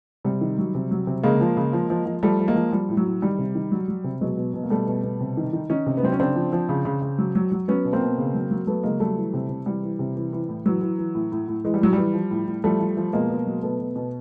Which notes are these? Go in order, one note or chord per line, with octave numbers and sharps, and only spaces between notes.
C3 G3
D#3
F#3
C3
F#3
C3
C#3 G#3 A#3
F3
C#3
F3
F3
F3
F3 G3 A3
F3
G#3 A#3
F3
F3 G3
A2
F#3
A2
D#3 G3
C3
D#3
F#3
F#3
C3
B2 F#3 G#3
B2
B2
A#3
B2 G3 A3
B2
B2
C3
D#3
D#3
D#3 C#4 D#4
C3
B3
F#3 C4
C#4
C#3 C4 D4
F3
F3
C#3
C#3
C#3
F#3
F#3
F#3
F#3 B3 C#4
B2
A#3 C4
B2
C#3
F#3
F#3
F#3 A3 B3
C#3 G#3 A#3
F#3 G3 A3
E3
C3
C3
E3 G3
E3
C3
E3
E3
A2
E3 F#3
E3
E3
A2
A2
A2
E3 G#3
G3
A2 F#3
E3 G3
F3
A2
A2
F3 G3 A3
F3
F3
B2 G#3 A#3
B2
F#3
B2 A3 B3
B2
B2